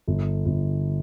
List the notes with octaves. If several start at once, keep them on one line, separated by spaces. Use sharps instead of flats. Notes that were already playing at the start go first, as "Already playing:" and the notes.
G1
G1